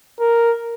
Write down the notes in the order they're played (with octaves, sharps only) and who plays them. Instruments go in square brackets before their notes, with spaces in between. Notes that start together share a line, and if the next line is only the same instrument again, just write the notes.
[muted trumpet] A#4